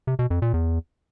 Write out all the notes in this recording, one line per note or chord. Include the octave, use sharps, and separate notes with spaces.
C3
B2
F2
A#2
E2